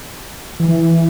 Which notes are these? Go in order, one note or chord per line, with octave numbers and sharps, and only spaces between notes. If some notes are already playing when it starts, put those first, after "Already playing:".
E3